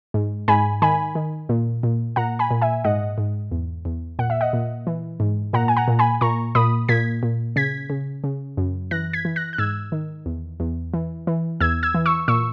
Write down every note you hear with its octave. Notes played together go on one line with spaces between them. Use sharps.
G#2
G#2 G#5 B5
D#3 G#5 B5
D#3
A#2
A#2
A#2 F#5 A#5
G#5 B5
A#2
E5 G#5
G#2 D#5 F#5
G#2
E2
E2
A#2 F#5
E5
D#5 F#5
A#2
E3
G#2
A#2 F#5 A#5
G#5
F#5 A#5
A#2
G#5 B5
A#2 A#5 C#6
A#2 B5 D#6
A#2 G#6 B6
A#2
C#3 G#6 B6
C#3
C#3
F#2
E3 F#6 A#6
G#6 B6
E3
F#6 A#6
F#6
G#2 E6 G#6
D#3
E2
E2
E3
E3
E2 E6 G#6
E6 G#6
E3
C#6 E6
A#2 C#6 E6